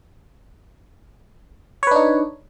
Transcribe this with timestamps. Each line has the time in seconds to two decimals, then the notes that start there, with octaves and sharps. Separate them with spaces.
1.83 C#5
1.87 B4
1.91 D4
1.96 D#4